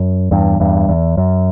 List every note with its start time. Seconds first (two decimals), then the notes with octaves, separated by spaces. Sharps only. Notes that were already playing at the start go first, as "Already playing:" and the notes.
Already playing: F#2
0.31 E2 G2
0.60 E2 G2
0.89 E2
1.17 F#2